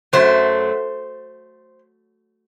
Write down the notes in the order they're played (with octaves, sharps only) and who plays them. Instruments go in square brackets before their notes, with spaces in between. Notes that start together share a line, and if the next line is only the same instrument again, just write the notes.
[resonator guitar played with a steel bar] F#2 F#3 A3 C5